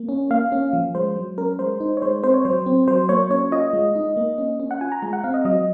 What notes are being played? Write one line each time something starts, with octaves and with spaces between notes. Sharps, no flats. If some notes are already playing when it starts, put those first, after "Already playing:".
Already playing: A#3
C#4
A#3 F5
C#4
F3
G#3 C5
F#3
C#4 A#4
G#3 C5
D#4
C#5
G#3 C5
C4 C5
C#5
F#3 C5
C4
F#3 C5
A#3 C#5
C#4 C#5
F4 D#5
G#3
D#4
A#3
C#4
C#4
F#5
F4 G#5
A#5
G#3 A#5
F#5
C4 F5
D#5
F#3 D#5